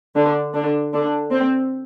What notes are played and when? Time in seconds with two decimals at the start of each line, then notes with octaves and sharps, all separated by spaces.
0.16 D3 D4
0.54 D3 D4
0.93 D3 D4
1.31 C4